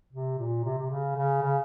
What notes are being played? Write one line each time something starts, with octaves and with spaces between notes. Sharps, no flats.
C3
A#2
C3
C3
C#3
C#3
C#3